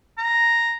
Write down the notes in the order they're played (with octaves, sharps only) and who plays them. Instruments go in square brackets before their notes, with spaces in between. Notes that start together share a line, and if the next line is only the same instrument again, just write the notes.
[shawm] A#5